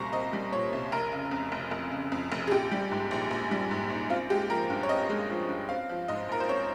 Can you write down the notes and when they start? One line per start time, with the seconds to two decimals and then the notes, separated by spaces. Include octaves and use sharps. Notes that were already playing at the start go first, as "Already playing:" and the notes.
Already playing: C2 A#2 G3 C4 A#5 C#6
0.13 C4 D#5
0.33 G3
0.52 A#2 C#5
0.73 C2
0.92 F1 A#4
1.12 C#3
1.31 F2
1.52 F1
1.71 F1
1.91 C#3
2.12 F2
2.32 F1
2.48 G#4
2.51 A#1 G4
2.71 G3
2.91 G#2
3.11 A#1
3.31 A#1
3.51 G3
3.71 G#2
3.90 A#1
4.10 C4 F4
4.30 G#3 G4
4.50 F3 A#4
4.70 G2
4.83 C#5
4.89 C4 D#5
5.10 G#3
5.30 F3
5.49 G2
5.69 C4 F5
5.89 F3
6.08 G#2 D#5
6.29 A#1 A#4
6.40 C5
6.49 C4 C#5